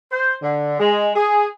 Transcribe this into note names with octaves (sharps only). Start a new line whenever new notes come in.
C5
D3
G#3
G#4